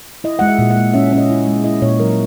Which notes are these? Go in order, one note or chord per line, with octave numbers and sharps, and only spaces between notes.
E4 D#5
G#3 F#5
E5
A#2
F#5
G#3
C#4 E5
C#4
D#5
E4
G#3
E4 D#5
A#2 C#5
F#3 A#4